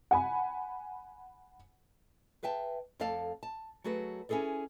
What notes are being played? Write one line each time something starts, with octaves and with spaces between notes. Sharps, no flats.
F#5 G#5 B5
G#4 B4 E5 G5 A5
F2 A3 A4 D5 F5 A5
A5
F#3 A3 F#4 G#4 B4
C#4 E4 G#4 A4 D5